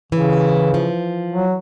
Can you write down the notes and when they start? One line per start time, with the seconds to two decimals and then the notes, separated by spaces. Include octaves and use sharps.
0.12 C#3 E3
0.74 F3
1.32 F#3